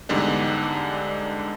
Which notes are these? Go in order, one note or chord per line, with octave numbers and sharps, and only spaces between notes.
E2 G#2 D3 G3 D4 D#4